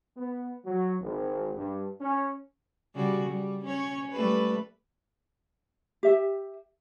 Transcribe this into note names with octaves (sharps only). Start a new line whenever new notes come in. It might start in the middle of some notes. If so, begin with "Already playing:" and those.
B3
F#3
G#1
G2
C#4
C#3 G3 F#4
G3
C#4 C#5
G3 A3 B4
G4 E5